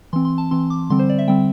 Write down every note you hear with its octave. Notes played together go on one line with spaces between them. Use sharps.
E3 C4 C6
C6
A5
E3 C4 C6
D6
D3 G3 C4 C6
C5
D5
E5
D3 G3 C4 G5